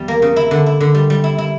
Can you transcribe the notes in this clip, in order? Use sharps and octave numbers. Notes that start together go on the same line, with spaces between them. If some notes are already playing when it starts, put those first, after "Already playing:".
Already playing: E2 G3
A#3
C#3
E4
D3
E4
D3
G3
G3
E4
E4